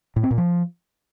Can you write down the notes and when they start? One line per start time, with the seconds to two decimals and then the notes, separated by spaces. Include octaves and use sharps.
0.16 A2
0.23 C4
0.31 A#2
0.38 F3